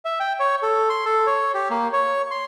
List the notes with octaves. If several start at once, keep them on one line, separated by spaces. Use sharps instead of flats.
E5
G5
C#5
A4
C6
A4
C#5
G4
A#3
C#5
C6